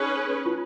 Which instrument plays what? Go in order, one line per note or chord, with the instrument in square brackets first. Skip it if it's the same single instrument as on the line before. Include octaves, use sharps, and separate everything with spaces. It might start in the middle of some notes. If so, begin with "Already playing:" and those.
Already playing: [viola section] C#4 G#4 B4 [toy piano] D#4
[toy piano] F4